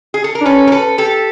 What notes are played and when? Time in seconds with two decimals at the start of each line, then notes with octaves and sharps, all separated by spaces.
0.14 G#4
0.24 A4
0.35 A#4
0.41 D4
0.45 C#4 A4 B4
0.67 A#4
0.72 A4 B4
0.98 G4 A4